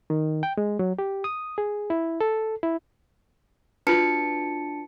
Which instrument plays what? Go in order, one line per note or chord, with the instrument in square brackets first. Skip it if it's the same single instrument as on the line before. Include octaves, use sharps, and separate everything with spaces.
[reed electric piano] D#3
G5
G#3
F#3
G4
D#6
G#4
E4
A4
E4
[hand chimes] D4 A5 C#7 [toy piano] F4 F#4 B4